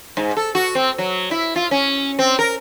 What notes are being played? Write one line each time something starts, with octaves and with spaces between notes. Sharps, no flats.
G#2
A4
F#4
C4
F#3
E4
F4
C#4
C4
A#4